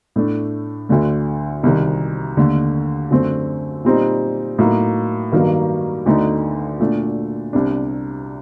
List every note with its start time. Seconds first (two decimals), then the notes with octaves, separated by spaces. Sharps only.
0.16 A2 A3 D4
0.89 D2 D3 A3
1.63 C2 C3 D#3
2.37 D#2 D3 A3
3.11 F#2 D3 A3 C4
3.85 A#2 G3 C4 D#4
4.59 A2 F#3 A#3 D#4
5.32 G2 D#3 F#3 A#3
6.06 D2 D3 A3 D#4
6.79 A#2 A3 D4
7.53 C2 C3 G3 D4